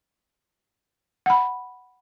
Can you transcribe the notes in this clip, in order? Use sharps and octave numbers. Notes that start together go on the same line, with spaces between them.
F#5 B5